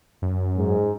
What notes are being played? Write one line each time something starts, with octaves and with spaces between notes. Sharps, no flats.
F#2
G#2